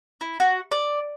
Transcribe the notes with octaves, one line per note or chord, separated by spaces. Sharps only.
E4
F#4
D5